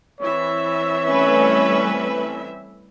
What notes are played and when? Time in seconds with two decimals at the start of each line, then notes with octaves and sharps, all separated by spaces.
0.21 E3 C4 C#5 E5
1.08 G3 A3 C#4 B4